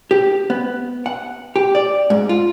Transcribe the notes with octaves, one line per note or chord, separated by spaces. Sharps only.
G4
B3
F#5
G4
D5
G#2
F4